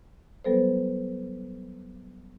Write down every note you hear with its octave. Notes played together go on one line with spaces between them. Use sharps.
F#3 G3 B3 A4 B4 C5